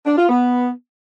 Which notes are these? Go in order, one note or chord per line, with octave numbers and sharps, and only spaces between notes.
D4
F4
B3